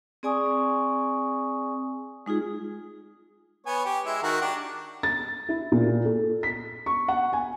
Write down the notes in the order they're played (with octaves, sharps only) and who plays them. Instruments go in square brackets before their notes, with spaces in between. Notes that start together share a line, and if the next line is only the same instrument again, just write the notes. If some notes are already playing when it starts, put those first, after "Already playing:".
[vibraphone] C4 G#4 D5 G#5 C#6 D#6
G#3 D#4 F4 G#4
[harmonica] B3 C#5 G#5
G4
G#3 E4 E5
D#3 F#4 A#4
D4 G4
[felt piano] A6
E4
A#2
A4
B6
C#6
F#5
G#5